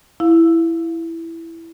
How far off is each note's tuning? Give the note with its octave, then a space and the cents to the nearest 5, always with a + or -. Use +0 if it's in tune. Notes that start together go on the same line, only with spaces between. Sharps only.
E4 +5 F5 +0